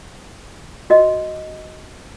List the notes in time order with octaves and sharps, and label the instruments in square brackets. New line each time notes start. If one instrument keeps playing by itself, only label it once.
[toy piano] F#4 D#5